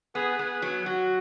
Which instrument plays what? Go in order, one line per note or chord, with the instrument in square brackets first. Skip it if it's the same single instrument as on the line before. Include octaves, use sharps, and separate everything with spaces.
[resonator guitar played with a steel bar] B3 [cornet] G#4
[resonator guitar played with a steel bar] B3
F#3
[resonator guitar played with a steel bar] F#3 [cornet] F#4